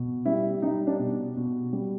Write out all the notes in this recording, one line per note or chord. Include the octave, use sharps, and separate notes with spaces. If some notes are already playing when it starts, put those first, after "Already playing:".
Already playing: B2
G3 E4
G3 D#4
D4
B2
B2
G3